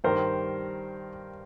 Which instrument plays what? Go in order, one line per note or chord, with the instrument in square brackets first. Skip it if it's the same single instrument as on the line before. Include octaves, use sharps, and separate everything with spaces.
[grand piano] G2 D#3 G3 A#4 C5